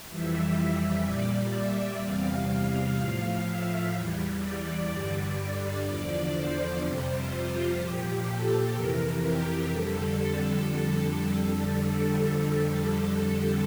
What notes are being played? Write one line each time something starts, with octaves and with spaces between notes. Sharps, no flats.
F2 E3 G3 E5
E5
A#2 G3 D5
E5
E2 C3 G3 F5
A2 F3
E5
E2 E3 G3
D5
G2 D3 G3
E2 D3 F3
C5
F2 C3 G3
F4
A#2 F3 G4
A4
F2 C3 E3 A#4
G4
F2 D3 G3 A4